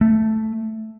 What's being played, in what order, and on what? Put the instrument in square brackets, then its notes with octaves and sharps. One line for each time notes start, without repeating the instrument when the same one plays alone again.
[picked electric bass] A3